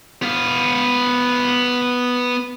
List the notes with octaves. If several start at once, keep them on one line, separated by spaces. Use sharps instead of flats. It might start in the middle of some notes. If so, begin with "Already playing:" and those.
B3 F5